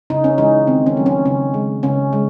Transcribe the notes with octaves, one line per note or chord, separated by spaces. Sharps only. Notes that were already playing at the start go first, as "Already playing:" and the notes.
C#3 D#4
C#4
E3 G#3 D#4
D#3 C4
C#4
F#3 A3
C#4
C#3 C#4
G#3
C#3 C#4
G#3